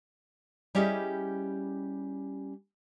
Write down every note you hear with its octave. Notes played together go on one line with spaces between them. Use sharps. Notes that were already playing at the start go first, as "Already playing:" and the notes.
G3 C#4 E4 G4 G#4 D#5